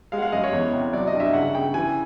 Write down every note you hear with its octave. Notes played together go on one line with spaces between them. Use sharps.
G#3 F5
F#5
F5
F#2 D#5
C#5
E2
C3
F#3 D5
D#5
G2
E5
C#3 F#5
C#3 G5
E3 G#5